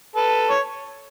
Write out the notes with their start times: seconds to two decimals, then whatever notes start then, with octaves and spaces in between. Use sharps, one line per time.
0.16 A4 B4
0.50 C#5